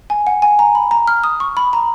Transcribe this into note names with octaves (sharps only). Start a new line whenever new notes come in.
G#5
F#5
G#5
A#5
B5
A#5
F6
D#6
C#6
B5
A#5